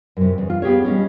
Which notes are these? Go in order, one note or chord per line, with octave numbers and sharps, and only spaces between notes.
F#2 C3
E2
F4
B3 G4 G#4 C#5
G3 G#3 C#4